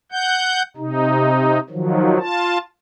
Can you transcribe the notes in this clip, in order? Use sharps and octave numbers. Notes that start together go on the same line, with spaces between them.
F#5 G6
C3 D#4
D#3 F3 F#3
F4 A5